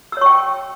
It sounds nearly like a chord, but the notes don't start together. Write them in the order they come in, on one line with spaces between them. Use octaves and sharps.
E6 C#5 C#6 G5